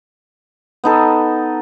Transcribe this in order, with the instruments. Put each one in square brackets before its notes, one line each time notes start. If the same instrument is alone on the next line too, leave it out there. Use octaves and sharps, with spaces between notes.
[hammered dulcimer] B3 D#4 A4